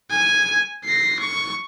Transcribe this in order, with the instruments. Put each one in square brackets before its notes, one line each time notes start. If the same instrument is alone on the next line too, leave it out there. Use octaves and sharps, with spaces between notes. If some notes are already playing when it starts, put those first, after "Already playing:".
[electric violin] G#5
A#6 C7
C#6